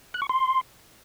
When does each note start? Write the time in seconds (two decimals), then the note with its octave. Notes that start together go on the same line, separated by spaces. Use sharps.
0.14 F#6
0.22 C#6
0.29 C6